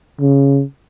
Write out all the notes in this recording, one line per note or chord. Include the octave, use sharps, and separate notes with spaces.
C#3